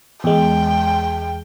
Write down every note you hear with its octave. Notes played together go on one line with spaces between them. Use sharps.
E2 G#3 G5